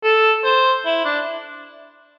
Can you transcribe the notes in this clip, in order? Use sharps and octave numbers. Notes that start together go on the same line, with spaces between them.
A4
C5
E4
D4